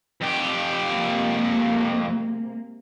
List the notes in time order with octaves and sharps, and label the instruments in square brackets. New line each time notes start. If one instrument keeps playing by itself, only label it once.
[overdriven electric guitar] F2 G4
[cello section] C3 G#3 A#3